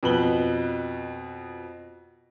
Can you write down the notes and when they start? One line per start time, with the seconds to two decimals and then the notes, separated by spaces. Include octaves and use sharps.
0.03 F2 B2 B4 F#7 G7